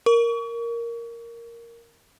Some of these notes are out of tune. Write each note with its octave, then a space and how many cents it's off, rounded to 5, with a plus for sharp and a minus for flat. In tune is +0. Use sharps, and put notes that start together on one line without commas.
A#4 +0 C#6 +35